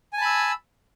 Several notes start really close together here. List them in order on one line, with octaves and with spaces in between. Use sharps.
G#5 A5 B5 E6